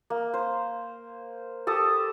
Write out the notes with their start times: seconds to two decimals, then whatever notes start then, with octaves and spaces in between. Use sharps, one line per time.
0.10 A#3
0.34 C5
1.67 G4 A4 A5 D#6